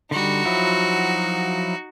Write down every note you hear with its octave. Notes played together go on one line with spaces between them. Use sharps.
D3 G3 D#4 F#4
F3 F#3 E4